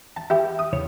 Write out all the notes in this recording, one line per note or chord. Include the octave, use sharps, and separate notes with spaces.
A5
E4 G4
D#6
E2 C#3 C#5